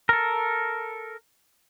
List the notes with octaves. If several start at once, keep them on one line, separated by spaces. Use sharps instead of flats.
A4 A#4